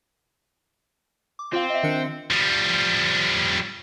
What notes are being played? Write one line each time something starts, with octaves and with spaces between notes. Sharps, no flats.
D6
C4 F4 F5
D#5 E5
D#3 D4 C#7
F3 G3